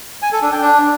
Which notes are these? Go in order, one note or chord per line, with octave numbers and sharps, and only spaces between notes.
G#5
A4
D4
G5
D4